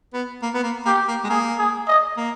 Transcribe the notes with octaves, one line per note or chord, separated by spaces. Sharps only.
B3
A#3
B3
A#3
A#3 G4
A#3
G#3
A#3 G#4
G#4
D#5
A#3